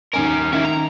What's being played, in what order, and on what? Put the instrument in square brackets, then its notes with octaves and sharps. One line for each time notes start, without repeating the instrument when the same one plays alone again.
[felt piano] D#2 G#5 [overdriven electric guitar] C#4 A#4
[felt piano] D#3 [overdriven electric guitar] C#4 E4
[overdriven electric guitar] A#5